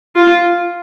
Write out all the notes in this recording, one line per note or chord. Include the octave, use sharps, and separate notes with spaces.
F4